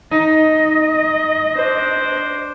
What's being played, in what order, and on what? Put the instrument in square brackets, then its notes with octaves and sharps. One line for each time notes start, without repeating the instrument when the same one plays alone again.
[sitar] D#4 [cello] D#5
[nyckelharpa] D4 C5